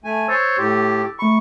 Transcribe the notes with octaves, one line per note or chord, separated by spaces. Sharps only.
A3 G#5
C5 C#5 E6 A6
A2 G4
A3 B5 C#6